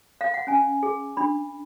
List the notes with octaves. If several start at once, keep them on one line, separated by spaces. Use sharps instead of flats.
F5
F#5
C#4 G#5
G#4
D4 B5